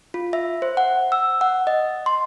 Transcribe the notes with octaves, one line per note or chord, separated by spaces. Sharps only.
F4
E5
C5
F#5
E6
F#5
D#5
C6